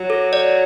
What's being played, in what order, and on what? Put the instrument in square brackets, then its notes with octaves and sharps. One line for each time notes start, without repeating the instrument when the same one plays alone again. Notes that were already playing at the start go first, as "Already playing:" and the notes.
Already playing: [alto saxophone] F#3
[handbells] A4
D5